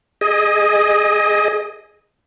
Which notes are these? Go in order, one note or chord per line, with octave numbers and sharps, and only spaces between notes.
G#4 D#5